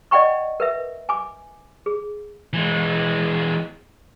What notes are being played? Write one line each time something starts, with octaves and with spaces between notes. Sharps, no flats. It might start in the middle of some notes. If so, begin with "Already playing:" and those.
D5 D#5 F#5 G5 B5 C#6
A#4 B4 E5
G#5 D6
G#4
E3 G#3